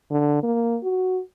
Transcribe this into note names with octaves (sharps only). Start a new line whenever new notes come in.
D3
A#3
F#4